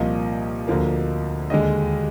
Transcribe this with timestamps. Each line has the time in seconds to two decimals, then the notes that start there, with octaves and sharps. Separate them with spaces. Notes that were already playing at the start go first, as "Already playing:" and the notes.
Already playing: C2 A#2 F3 A#3 D#5
0.68 D2 D3 F3 A#3
1.50 D#2 D3 G#3 D#5